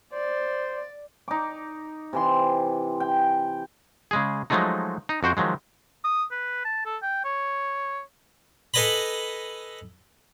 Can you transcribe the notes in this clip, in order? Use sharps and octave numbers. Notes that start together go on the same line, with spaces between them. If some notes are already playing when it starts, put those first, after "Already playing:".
C5 D5
D#4 D6
C3 E3 C6
G5
C#3 G#3 G#4
F3 F#3 G#3 A3 D#4
D#4
F2 F#4 C5 G5
D#3 F3 F#3 G#3
D#6
B4
A5
A4
G5
C#5
A4 B4 D#5 G#5 A#5 B5